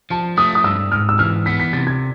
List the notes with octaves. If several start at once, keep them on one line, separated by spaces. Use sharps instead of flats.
F3 A5
A3 D#6
D#6
G2 E6
G#2 F6
E6
E3 F6
B3 B6
B6
C3 A6
G#6